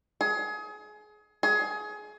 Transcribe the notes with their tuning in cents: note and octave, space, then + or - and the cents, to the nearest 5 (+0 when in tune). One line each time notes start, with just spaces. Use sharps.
G#4 +25
G#4 +20